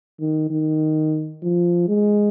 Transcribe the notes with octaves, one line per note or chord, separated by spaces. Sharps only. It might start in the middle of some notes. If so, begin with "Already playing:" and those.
D#3
D#3
F3
G#3